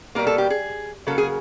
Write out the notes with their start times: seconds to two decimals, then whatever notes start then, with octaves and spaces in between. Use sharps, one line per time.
0.15 B2 G3 A#3 A#4
0.27 A4
0.38 G4
0.50 G#4
1.07 C#3 F#3 A#3 A4
1.18 G#4